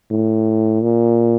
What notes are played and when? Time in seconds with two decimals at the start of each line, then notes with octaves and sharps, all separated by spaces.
0.11 A2
0.83 A#2